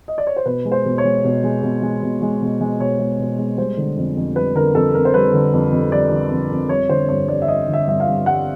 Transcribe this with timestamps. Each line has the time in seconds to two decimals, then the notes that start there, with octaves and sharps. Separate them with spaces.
0.08 D#5
0.18 D5
0.27 C#5
0.36 C5
0.46 B2 B4
0.65 G#3
0.72 C5
0.86 B2
0.98 C#5
1.04 G#3
1.24 B2
1.44 G#3
1.63 B2
1.82 G#3
2.02 B2
2.22 G#3
2.42 B2
2.61 G#3
2.80 B2 C#5
2.99 G#3
3.19 B2
3.38 G#3
3.58 G3 C5
3.77 D3
3.97 F2
4.17 F2
4.36 G3 B4
4.55 D3 A#4
4.75 F2 A4
4.94 F2 A#4
5.05 C5
5.14 G3 B4
5.33 D3
5.53 F2
5.72 F2
5.92 G3 D5
6.12 D3
6.31 F2
6.51 F2
6.69 G3 C#5
6.89 D3 C5
7.09 G2 C#5
7.28 G2 D5
7.42 E5
7.47 G3 D#5
7.68 D3
7.74 E5
7.87 G2 E5
8.00 F5
8.06 G2
8.26 G3 F#5